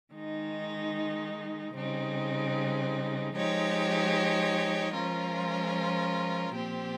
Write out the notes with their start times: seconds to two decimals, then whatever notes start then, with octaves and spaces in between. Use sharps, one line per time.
0.13 D#3 G#3 D#4
1.74 C#3 G3 C4 D#4
3.34 F3 G#3 D#4 G4 C#5
4.94 F3 G#3 C#4 F4 A#4
6.55 A#2 F3 C4 G4 C5